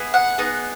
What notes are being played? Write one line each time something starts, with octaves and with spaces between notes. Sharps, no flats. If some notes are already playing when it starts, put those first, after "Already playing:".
Already playing: B3 E4 G#4
F#5
B3 D#4 G#4